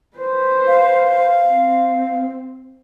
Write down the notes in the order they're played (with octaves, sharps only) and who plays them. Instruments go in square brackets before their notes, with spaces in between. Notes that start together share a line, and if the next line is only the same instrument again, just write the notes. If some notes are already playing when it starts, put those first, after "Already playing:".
[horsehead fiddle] B4 C5
[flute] F5
[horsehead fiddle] C4